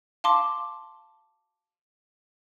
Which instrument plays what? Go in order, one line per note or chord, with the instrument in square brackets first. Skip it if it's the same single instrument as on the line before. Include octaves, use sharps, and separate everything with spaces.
[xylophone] F5 A5 C6 D6